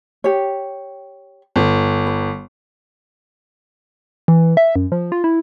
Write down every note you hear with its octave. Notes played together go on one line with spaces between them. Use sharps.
G4 C#5
G1
B4
E3
E5
F#2
F3
F4
E4